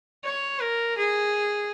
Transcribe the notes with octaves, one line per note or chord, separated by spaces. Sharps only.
C#5
A#4
G#4